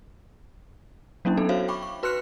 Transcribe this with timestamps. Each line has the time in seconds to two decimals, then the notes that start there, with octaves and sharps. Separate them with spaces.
1.25 F#3 A#3 C#4 D4 E4
1.37 B3 D#4 A4
1.49 F#4 A4 C5 C#5 E5 F5
1.68 G5 B5 C#6 D6
1.83 C#6
2.03 F#4 B4 C6 F6 F#6 C#7